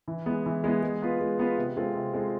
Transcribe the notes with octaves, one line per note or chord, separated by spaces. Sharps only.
E3
G#3 B3 E4
E3
G#3 B3 E4
G#3
B3 F4 B4
G#3
B3 F4 B4
C3
G#3 C4 F4 A4
C3
G#3 C4 F4 A4